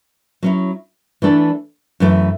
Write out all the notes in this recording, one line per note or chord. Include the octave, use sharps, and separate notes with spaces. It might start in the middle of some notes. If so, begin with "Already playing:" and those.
F#3 C#4 E4
E3 A3 D4 A4
F#2 E3 A3